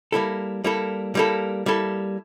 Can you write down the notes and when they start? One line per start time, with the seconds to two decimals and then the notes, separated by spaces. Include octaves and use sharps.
0.12 G3 A#3 E4 A4
0.64 G3 A#3 E4 A4
1.15 G3 A#3 E4 A4
1.66 G3 A#3 E4 A4